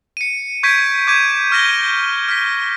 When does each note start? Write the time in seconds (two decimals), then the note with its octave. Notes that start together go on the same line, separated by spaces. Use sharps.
0.17 C#7 D#7
0.63 C#6 G6 G#6 B6 D7
1.07 D6 G6 G#6 D#7
1.51 C#6 F6 G#6 A#6 D#7 G7
2.29 F6 B6